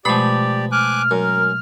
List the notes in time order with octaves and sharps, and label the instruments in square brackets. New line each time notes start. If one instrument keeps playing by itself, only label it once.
[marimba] B2 G#3 A3 [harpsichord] F3 B5 [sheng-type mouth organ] G4 D5
[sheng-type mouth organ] G#5 D6 F#6 [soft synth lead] F6
[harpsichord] F#2 [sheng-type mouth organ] A#4